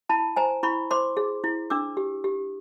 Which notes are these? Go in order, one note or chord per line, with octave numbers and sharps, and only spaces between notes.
E4 A5 B5
C5 G#5 A#5
E4 B5 C#6
C5 C6 D6
G#4
E4
D4 D6 E6
G4
G4